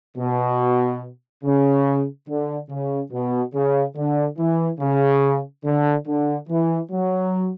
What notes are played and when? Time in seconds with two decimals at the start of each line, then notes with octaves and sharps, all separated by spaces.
0.17 B2
1.44 C#3
2.28 D3
2.70 C#3
3.12 B2
3.54 C#3
3.96 D3
4.38 E3
4.80 C#3
5.64 D3
6.06 D3
6.48 E3
6.91 F#3